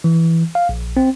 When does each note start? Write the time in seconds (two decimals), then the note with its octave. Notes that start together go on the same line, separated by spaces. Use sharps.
0.04 E3
0.55 F5
0.69 A#1
0.97 C4